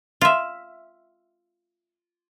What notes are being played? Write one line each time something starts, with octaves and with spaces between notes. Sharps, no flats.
F4 E5